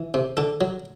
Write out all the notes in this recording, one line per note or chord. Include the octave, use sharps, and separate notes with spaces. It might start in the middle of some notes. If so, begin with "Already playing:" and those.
Already playing: E3
C3
D3 A4
F#3